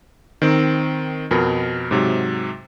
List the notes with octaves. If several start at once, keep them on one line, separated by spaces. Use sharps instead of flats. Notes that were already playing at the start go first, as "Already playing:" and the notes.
D#3 C4
F2 B2 A#4
G#2 C3 F#3